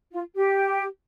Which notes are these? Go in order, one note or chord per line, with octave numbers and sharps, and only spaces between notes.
F4
G4